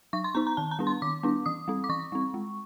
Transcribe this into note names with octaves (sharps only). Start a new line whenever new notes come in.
F#3 C#6
C6
B3 D#4 A#5
A#5
D#3 A5
A#5
G3 B3 D4
C6
D#3 D6
G3 B3 D4
E3 D#6
G3 C4
D6
E3 C#6
G3 C4
G#3